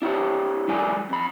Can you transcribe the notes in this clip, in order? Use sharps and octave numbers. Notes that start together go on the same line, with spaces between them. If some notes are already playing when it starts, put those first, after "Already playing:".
D4 E4 G4 C#5
E3 F#3 G#3 D5 G#5
F2 B5